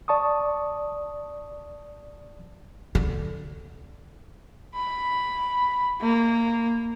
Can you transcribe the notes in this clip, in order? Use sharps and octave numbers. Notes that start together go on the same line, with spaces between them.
D5 A5 C#6 D#6
D3
B5
A#3